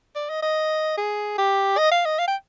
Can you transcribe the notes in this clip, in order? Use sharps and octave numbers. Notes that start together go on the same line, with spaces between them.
D5
D#5
D#5
G#4
G4
D#5
F5
D#5
F5
G5